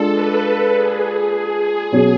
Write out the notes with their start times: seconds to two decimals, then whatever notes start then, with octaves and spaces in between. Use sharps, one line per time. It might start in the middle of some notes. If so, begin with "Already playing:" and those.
Already playing: G#3 D4 F4 A4 D5
0.13 B4
0.72 G#4
1.02 G#4
1.92 B2 F#3 C#4